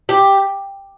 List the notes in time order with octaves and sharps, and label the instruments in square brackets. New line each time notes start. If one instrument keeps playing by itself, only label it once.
[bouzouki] G4